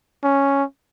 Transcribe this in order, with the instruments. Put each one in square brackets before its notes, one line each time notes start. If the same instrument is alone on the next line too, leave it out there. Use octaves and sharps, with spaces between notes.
[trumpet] C#4